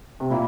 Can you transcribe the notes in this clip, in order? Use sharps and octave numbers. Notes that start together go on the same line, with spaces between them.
C3
A#2 G3 A#3 E4